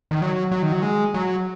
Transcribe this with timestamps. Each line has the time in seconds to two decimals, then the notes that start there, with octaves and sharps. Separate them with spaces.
0.11 D#3
0.22 F#3
0.51 F#3
0.62 D#3
0.72 F#3
0.82 G#3
1.14 F#3